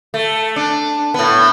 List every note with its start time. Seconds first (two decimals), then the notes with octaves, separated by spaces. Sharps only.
0.14 A3
0.56 D4
1.14 A2 B3